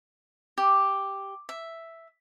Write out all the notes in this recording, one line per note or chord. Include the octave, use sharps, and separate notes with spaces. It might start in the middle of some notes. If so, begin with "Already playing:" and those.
G4
E5